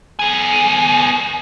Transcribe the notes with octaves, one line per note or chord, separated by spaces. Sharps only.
B3 G#5